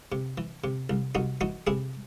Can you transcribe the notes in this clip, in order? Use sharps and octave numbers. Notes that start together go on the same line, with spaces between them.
C3
E3
C3
C2
C2 D#4 F#4
E3 D#4 F#4
C3 E4 G#4